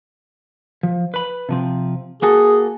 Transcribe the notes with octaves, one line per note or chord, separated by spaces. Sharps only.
F3
B4 B5
C3 F3 C4
A#3 F#4 G#4 A4